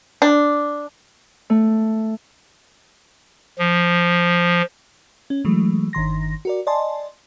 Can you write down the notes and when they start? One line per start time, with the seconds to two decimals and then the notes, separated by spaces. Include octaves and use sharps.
0.22 D4
1.50 A3
3.59 F3
5.30 C#4
5.45 E3 F#3 G#3 A3
5.93 G1 D#3 C6 A#6
6.45 F#4 A#4 D5
6.67 D5 D#5 G#5 A5 C6